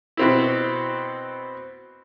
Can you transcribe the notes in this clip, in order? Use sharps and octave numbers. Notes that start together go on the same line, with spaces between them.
B2 C4 E4